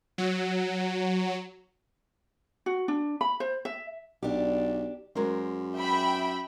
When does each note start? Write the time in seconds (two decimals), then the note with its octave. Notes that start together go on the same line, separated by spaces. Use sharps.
0.18 F#3
2.66 F#4
2.88 D4
3.21 B5
3.40 C5
3.65 E5
4.23 B1 D4 G4
5.16 F#2 G#3 A#4 C5
5.75 E5 G5 B5